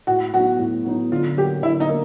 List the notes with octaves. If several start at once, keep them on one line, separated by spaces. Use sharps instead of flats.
A2 F#4
F#3 B3 D#4 F#4
A2
F#3 B3 D#4
D3 F4
F#3 A#3 G4
D3 E4
D#4
A#3